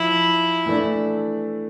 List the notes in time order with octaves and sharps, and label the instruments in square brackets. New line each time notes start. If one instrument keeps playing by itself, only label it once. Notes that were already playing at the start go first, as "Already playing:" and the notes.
Already playing: [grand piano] F3 [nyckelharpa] E4
[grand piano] E3 A3 D4